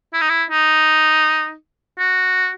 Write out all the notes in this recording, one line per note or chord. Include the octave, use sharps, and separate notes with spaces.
E4
D#4
E4
D#4
F#4